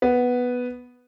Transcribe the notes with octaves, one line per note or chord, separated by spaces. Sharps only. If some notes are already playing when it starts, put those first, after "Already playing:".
B3